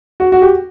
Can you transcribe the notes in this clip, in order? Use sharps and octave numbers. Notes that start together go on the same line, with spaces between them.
F#4
F#4
G4